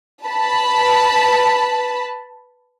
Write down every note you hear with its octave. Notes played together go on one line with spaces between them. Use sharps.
B4 A5 B5